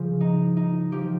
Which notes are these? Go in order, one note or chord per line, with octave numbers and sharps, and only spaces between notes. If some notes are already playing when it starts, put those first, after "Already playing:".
Already playing: C#3 F3 G#4
D#4
D#4
F3 G4